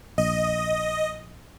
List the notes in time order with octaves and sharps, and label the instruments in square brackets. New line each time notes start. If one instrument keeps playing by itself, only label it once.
[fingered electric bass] A#1 [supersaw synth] D#5